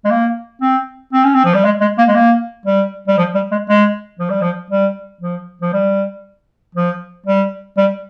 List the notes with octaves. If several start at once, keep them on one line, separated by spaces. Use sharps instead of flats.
G#3
A#3
C4
C4
C#4
C4
F3
G3
G#3
G#3
A#3
G#3
A#3
G3
G3
F3
G3
G#3
G#3
F3
G3
F3
G3
F3
F3
G3
F3
G3
G3